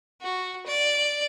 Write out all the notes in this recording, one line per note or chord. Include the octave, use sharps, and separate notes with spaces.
F#4
D5